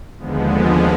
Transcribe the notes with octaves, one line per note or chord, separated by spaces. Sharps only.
D#2 D3 F3 G#3 B3